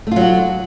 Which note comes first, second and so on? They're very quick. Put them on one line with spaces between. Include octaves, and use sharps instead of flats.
A3 F4 F#3 F#4